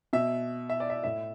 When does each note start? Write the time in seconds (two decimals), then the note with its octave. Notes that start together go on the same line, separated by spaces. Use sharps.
0.13 B2 E5
0.70 E5
0.80 D5
0.90 E5
1.04 A2 E5